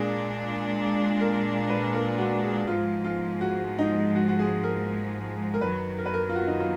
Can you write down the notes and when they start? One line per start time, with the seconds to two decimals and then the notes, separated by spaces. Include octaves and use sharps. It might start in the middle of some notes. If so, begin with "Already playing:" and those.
Already playing: A#2 G#3 D4 G#4
1.21 A#4
1.70 B4
1.95 A#4
2.18 F#4
2.43 G#4
2.67 G#2 F3 G#3 F4
3.04 F4
3.41 F#4
3.79 D#4
4.15 F#4
4.28 F#4
4.39 G#4
4.63 A#4
5.54 A#4
5.61 F#2 D#3 F#3 B4
5.98 A#4
6.06 B4
6.14 A#4
6.29 F4
6.35 F#4
6.47 D#4
6.60 F4